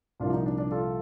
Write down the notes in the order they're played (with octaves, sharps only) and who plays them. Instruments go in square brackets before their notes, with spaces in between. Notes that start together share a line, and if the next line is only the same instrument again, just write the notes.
[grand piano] C2 A#2 F3 D4 F4
D#4
D4
D4
F4 A4